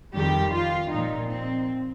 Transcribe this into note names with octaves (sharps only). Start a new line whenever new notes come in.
F2 D#3 G3 G4
F4
A#2 F3 D#4
C4